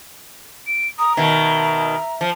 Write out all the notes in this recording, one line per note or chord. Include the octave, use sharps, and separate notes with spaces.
D7
A#5 D#6
B2 D#3 E5
F3